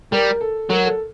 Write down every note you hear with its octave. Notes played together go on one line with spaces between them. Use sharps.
G3 A#4
A4
F#3 A#4
A4